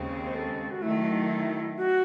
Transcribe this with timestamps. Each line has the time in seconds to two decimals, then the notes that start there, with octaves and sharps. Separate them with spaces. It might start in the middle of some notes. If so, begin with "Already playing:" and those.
Already playing: D#2 C#3 G#3 C4
0.26 C5
0.35 A4
0.70 F#4
0.82 D#3 F#3 A3 E4
1.77 F#4